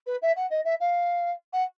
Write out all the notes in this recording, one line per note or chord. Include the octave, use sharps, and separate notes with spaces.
B4
E5
F#5
D#5
E5
F5
F#5